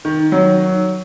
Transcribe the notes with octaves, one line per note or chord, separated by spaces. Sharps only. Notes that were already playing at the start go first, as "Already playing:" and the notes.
D#3
F#3